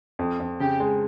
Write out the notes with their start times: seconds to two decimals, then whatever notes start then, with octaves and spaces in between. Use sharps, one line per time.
0.19 F2
0.40 F2
0.60 C#3 G4
0.80 G#3